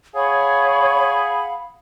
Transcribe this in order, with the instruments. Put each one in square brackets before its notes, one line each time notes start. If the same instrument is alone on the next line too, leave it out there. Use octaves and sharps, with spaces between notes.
[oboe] G#4 [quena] C#5 [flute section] F5 F#5 B5